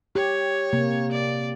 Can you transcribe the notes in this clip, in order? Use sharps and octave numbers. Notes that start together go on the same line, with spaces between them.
G4 C#5
C3 A#3
D5